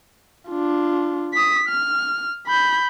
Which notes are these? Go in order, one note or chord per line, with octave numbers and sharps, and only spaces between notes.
D4 F4
D#6 B6
F6
B5 G6